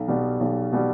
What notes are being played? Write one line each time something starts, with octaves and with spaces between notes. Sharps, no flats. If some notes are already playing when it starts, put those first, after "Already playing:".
Already playing: B1
B2 G3
B1
B2 G3